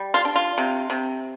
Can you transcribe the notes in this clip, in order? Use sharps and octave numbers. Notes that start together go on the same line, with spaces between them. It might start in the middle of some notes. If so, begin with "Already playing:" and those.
Already playing: G3
F4
D4
F4
C3
C3